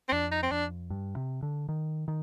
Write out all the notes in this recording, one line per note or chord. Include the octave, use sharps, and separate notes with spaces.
C4
F2 D4
D#4
C4
F2 D4
G2
C3
D3
D#3
D#3